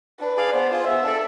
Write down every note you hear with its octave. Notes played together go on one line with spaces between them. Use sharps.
D4 B4
G#4 D5 F5
B3 C5
F4 G#4
B3 E5
D4 A4 D5